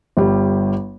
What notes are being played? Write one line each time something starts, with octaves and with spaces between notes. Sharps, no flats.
G1 G3